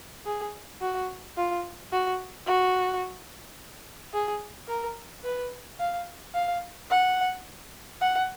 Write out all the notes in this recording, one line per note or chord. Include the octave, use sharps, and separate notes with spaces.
G#4
F#4
F4
F#4
F#4
G#4
A#4
B4
F5
F5
F#5
F#5